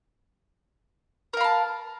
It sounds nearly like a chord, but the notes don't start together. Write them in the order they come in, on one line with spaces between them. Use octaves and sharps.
A#4 F5 B5 A5